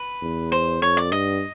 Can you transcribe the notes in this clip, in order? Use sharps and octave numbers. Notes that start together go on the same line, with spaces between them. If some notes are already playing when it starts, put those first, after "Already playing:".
Already playing: B4
E2
C5
F2 C#5
D5
G2 D#5